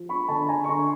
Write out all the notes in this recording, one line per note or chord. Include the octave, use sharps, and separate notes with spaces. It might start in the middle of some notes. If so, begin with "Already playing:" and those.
Already playing: F3
B5 C#6
D3 A5 B5
G#5 A#5
C#6
D3 A#5 C6